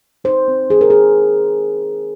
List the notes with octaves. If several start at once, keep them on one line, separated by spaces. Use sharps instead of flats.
D#4 C5
C4
D#3 G#4
A#4
G#4